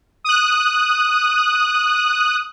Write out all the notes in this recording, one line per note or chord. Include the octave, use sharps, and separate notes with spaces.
D#6 F#6